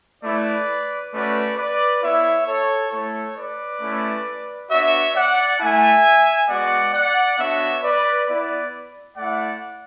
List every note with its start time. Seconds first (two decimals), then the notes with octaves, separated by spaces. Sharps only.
0.23 A3 E4 B4 D5
1.13 A3 C#4 F#4 B4 D5
1.57 B4 D5
2.02 B3 E4 C#5 E5
2.47 A4 C#5
2.92 A3 E4 A4 C#5
3.36 B4 D5
3.81 A3 C#4 E4
4.70 B3 D4 F#4 C#5 E5
5.15 D5 F#5
5.60 A3 E4 E5 G#5
6.49 G#3 B3 F#4 D5 F#5
6.93 D5 F#5
7.38 B3 D4 F#4 C#5 E5
7.83 B4 D5
8.27 B3 E4 B4 D5
9.16 A3 E4 D5 F#5